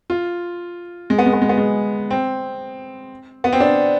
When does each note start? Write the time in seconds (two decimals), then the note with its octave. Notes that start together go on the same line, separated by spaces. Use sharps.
0.10 F4
1.10 G#3
1.18 B3
1.26 G#3
1.33 B3
1.42 G#3
1.49 B3
1.58 G#3
2.11 C4
3.44 B3
3.53 C4
3.60 D4